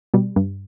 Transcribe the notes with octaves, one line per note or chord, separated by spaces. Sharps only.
B2 G3
G2